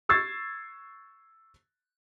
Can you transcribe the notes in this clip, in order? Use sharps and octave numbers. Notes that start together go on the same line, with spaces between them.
C#6 E6 G#6 A6 C7